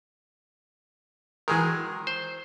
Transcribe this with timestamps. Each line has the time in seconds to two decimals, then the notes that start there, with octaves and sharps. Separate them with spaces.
1.48 D#3 E3 F#3 G#3 G#4 A#4
2.07 C5